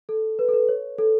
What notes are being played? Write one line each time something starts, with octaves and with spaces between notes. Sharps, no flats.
A4
B4
A4
B4
C#5
A4